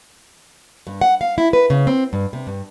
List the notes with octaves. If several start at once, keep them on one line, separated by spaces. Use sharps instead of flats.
G2
F#5
F5
E4
B4
C#3
C4
G2
C3
G2